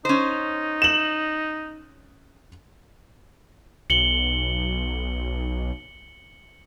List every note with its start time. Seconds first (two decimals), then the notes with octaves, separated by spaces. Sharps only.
0.05 C#4 D#4 C5
0.82 E7 F#7
3.90 B1 C#7 F#7 G7